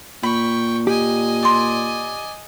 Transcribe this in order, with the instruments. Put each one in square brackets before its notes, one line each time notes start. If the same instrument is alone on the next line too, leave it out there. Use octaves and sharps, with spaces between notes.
[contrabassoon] A#2 [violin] G5 C#6 [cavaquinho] B5
[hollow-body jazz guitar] G4 [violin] D#5 G#5
[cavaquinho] D5 C6